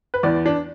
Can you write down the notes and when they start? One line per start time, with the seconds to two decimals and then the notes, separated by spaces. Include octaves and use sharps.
0.14 B4
0.23 E2 E3 D5
0.46 D4